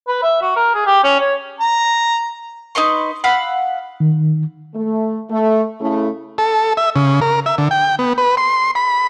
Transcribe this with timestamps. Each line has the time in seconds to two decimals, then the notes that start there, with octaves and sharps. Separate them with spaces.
0.08 B4
0.22 E5
0.42 F#4
0.56 A#4
0.74 G#4
0.86 G4
1.04 C#4
1.20 C#5
1.60 A#5
2.75 D#4 B4 C6 C#6
3.24 F5 F#5 B5 E6
4.00 D#3
4.74 A3
5.30 A3
5.80 C#3 A3 E4
6.38 A4
6.77 E5
6.96 C#3
7.21 A#4
7.46 E5
7.58 D3
7.71 G5
7.99 B3
8.18 B4
8.37 C6
8.75 B5